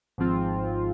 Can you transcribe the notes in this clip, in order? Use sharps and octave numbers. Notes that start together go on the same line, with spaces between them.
G#1 G#2 F3 C4 F4